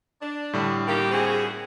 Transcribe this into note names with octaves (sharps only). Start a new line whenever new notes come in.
D4
A2 D3 G3
D#3 A#3 G4
C4 F#4 G#4